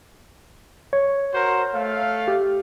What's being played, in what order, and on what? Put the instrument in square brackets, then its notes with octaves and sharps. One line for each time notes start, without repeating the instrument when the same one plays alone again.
[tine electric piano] C#5
[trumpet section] F#4 A#4 C5
A3 F5
[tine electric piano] G4